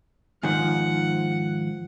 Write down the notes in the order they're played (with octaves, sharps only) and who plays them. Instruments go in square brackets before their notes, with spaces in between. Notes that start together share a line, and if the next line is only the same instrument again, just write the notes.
[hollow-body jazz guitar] G#2 D#3 F3 [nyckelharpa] F#5